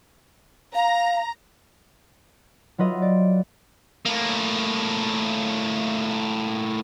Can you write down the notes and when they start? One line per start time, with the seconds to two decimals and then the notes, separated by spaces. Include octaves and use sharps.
0.75 F5 A#5
2.78 F#3 F4 B4 D#5 E5
3.02 D5
4.05 A2 A#3